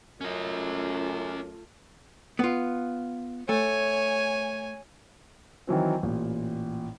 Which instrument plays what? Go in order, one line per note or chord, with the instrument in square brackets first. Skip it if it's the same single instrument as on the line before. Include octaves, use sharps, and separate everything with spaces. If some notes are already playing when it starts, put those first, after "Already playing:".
[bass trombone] F#2 [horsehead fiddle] A3 F4 [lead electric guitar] C#4 D#5
[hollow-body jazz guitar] B3 F4
[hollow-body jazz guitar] A3 [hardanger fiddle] C#5 G#5
[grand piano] D#3 E3 F#3 C4
A1 A#2